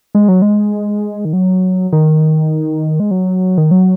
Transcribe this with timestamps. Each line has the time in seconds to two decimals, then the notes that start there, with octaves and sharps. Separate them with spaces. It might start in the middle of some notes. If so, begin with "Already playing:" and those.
0.15 G#3
0.28 F#3
0.42 G#3
1.25 D#3
1.33 F#3
1.93 D#3
3.00 G#3
3.11 F#3
3.57 D#3
3.71 F#3